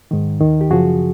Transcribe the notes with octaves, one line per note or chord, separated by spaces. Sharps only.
G#2 D#3
D#2 D#3
G4
F#2 C#3 F3 F#4 G#4